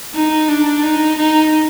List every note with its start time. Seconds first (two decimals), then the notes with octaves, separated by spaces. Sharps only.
0.14 D#4
0.49 D4
0.83 D#4
1.18 D#4